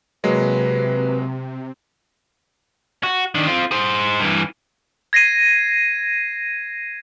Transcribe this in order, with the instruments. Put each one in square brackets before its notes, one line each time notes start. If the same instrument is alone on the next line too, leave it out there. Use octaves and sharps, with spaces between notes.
[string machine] C3 [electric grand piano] F#3 G#3 A#3 [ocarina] B4
[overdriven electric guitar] F#4
D#3 D4
C4 F4
G#4 C5
G2 E3
[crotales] G#6 A#6 C7 D#7